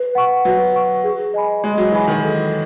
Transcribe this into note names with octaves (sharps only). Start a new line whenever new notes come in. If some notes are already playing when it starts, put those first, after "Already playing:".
Already playing: B4
F#5 C#6
F#3 B4
F#5 C#6
G#4
D#5 G#5 B5
G#3 G#4
F#3
E3 D#5 G#5 B5
D#3
A4